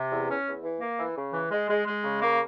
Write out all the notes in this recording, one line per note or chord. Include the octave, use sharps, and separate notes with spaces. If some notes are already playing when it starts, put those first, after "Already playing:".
Already playing: C3
E2
C#4
E2
E3
A#3
E3
C#3
E3
G#3
G#3
G#3
C#3
A#3